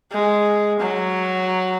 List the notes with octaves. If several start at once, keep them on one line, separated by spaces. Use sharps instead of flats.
G#3
F#3